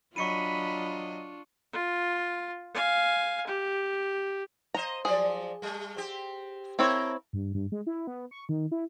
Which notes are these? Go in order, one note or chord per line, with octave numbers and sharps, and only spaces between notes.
F#3 D4 F4 D#5 B5 C#6 C#7 D#7
F4
F5 G#5
G4
F3 C5 D#5 A#5
F3 F#3 G#4 D5
G3 A3
C4 G4
A3 C4 E4 A#4 C#5
G2
G2
G#3
E4
B3
C#6
D#3
E4